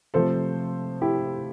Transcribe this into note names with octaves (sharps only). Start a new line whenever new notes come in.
C3 F3 A3 A4 C5
E4 G4